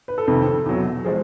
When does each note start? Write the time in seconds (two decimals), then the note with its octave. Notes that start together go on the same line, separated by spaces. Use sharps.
0.08 B4
0.18 A4
0.27 F2 C3 D#3
0.66 E2 B2 F#3
1.05 F3 G#3 G#4